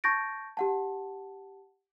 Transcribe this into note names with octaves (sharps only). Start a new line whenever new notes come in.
A5 C#6 G6 A6 A#6 D7
G4 F#5 A5